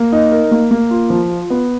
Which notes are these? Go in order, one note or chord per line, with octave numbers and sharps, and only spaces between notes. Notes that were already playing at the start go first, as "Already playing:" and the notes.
Already playing: A#3
D#4
A#4
A#3
A#3
F4
F3
F4
B3